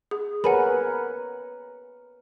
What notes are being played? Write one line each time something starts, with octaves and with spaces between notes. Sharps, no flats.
G#4
A#4 B4 C#5 F#5 G#5 B5